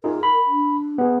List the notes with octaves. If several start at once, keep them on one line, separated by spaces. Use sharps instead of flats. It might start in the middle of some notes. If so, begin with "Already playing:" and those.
D#4 F4 G#4 A#4
B5
D4
B3 G#4